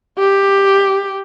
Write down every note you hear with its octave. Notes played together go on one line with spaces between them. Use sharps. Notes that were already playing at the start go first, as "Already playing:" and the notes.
G4